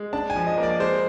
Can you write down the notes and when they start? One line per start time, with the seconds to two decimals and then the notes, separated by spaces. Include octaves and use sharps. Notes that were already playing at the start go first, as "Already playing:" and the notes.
Already playing: G#3
0.13 D4 A5
0.30 G#5
0.35 F3
0.47 D#5
0.58 A#3 D5
0.80 G#3 C5